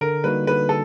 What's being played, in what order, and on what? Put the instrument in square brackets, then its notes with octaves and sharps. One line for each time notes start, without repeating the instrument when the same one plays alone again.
[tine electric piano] D3 [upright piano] A#4
[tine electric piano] G3 A#3 D#4 F#4 [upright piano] B4
[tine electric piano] D3 [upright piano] B4
[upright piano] A4